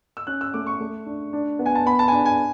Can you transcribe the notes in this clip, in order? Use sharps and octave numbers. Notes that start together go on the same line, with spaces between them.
E6
C#4 F#6
E6
A3 D6
C#6
A3
D4
D4
B3
G#5
A5
B3 B5
A5
G#5
D4 A5
G#5